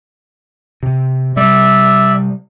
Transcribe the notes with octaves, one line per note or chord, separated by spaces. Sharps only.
C3
C3 G3 D5 E5